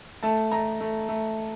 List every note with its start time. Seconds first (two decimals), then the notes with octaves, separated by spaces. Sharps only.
0.23 A3 A5
0.51 A3 A#5
0.81 A3
1.09 A3